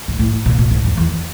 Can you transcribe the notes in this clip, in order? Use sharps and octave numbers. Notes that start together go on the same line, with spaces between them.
G#2
A2
A#2
A#2
G#2
F2
E2